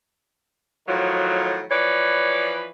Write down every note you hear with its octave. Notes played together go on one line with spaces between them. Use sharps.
A2 D#3 F3 F#3
E3 F3 B4 C#5 D5